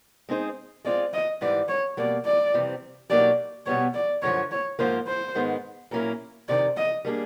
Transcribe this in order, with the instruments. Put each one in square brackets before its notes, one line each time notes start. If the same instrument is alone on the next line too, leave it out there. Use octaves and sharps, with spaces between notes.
[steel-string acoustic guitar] G#3 C4 D#4 G#4 C5
[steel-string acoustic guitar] G#3 C4 F4 [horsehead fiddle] D5
[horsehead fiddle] D#5
[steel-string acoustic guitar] G#2 E3 G3 [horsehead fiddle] D5
[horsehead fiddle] C#5
[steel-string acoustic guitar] B2 G3 A#3 [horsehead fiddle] D5
[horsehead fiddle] D5
[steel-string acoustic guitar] F2 C3 E3 G3 C4
[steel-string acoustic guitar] B2 F#3 A#3 D#4 G4 [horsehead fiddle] D5
[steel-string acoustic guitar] B2 G3 B3 [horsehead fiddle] C#5
[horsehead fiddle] D5
[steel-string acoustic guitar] F#2 D3 F3 [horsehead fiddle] C#5
[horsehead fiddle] C#5
[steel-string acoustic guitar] G#2 F3 A#3 [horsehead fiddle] C5
[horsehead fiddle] C5
[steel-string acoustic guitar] G#2 D#3 G#3 B3
[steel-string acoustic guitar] A#2 F#3 A#3 C#4 E4 [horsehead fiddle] A#4
[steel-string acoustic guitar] F2 C3 D#3 [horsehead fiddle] D5
[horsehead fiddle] D#5
[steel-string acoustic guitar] G3 A#3 D4 F4 G#4